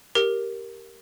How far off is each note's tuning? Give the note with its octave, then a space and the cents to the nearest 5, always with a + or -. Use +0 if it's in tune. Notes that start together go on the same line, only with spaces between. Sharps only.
G4 +0 A#4 +0